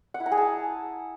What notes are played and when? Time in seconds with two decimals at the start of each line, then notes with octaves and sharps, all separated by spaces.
0.14 F#5
0.20 E4
0.26 A#5
0.32 G#4
0.37 A5